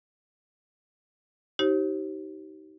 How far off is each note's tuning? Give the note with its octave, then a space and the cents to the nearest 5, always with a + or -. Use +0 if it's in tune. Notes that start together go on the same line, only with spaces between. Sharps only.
D#4 +15 G4 -30 C5 +40